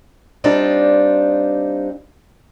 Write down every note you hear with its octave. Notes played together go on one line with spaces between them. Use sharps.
G3 C4 D4 D#4 F4